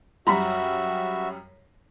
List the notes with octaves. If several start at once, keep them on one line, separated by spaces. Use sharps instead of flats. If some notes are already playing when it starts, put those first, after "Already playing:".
F#2 G3 F#4 E5 A#5 B5 B6